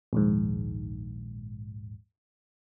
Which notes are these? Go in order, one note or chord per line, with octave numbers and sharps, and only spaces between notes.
A#1 D#2 G#2